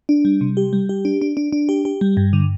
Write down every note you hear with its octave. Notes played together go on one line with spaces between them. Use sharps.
D4
G3
C3
G4
G3
G4
D4
D4
D4
D4
G4
G4
G3
G2
D3